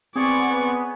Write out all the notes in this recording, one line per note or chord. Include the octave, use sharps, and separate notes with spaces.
B3 C4 G#4 C#5 D5 C6 C#6